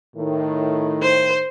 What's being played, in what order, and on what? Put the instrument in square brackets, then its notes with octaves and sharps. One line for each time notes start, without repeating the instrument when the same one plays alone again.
[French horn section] A2 D#3
[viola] C5